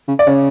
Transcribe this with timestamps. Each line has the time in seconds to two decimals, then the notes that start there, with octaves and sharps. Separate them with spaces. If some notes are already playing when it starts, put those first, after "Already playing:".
0.08 C#3
0.19 D5
0.27 C#3 C#5